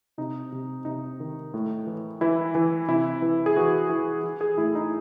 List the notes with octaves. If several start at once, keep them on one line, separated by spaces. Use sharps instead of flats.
C3 D#4
C3
C3 D#4
D#3
A2
E3
E3 E4
E3
C3 E4
E3
G#4
E3 F#4
E3
E3
G#4
A2 E4
D#4